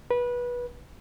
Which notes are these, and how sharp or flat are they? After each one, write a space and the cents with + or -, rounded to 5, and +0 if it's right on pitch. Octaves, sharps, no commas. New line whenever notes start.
B4 -20